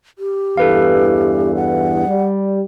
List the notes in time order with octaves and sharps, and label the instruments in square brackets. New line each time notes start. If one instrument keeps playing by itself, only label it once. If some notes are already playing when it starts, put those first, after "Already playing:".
[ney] G4
[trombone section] E2 G2 E3 [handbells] A4 B4 F5
[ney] F#5
[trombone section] G3